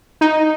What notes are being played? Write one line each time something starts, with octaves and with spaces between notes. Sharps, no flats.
D#4